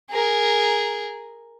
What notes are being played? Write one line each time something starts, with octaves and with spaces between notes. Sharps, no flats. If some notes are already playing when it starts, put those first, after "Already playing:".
G#4 A#4